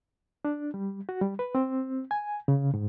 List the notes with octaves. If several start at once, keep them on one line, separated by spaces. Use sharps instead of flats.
D4
G3
F#4
G3
B4
C4
G#5
C#3
G#2